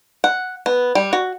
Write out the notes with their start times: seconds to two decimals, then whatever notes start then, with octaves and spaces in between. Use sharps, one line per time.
0.24 F#5
0.66 B3
0.95 G3
1.13 F#4